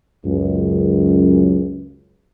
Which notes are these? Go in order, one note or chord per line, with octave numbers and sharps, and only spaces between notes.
C#2 F#2